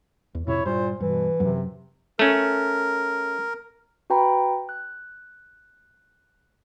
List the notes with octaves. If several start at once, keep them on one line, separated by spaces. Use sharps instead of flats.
E2
F2 A2 C3 E4 C#5
G2 A#2 C5
G2 B2 E3
F#2 C3 F#3
A3 C#4 A#4
F#4 B4 G5 A#5 B5
F#6